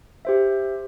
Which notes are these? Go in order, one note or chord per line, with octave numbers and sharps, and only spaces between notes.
G4 C5 E5